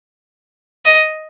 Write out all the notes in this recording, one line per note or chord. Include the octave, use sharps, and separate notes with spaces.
D#5